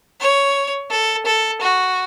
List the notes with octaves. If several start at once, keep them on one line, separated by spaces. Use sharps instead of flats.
C#5
A4
A4
F#4